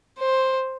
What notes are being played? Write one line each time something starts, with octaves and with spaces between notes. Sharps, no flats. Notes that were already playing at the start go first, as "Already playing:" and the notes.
C5